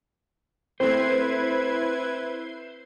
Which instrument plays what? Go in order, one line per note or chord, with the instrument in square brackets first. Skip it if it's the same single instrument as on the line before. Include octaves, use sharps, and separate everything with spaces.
[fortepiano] A3 C4 [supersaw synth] E4 B4 G#6 [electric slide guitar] C5